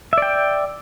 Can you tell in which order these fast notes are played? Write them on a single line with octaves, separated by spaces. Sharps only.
E5 D5 G5